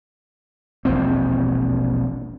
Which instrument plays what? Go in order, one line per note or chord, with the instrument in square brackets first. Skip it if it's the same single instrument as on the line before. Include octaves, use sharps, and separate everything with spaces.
[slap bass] E1 A#1 D#2 C4